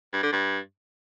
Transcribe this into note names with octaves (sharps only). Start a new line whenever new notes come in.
G2
D3
G2